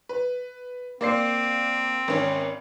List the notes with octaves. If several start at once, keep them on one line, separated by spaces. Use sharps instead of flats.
B4
A#3 C4 D5 C7
G#1 C#4